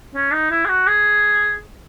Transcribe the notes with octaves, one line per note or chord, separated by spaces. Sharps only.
C#4
D#4
E4
G#4
F#4
G#4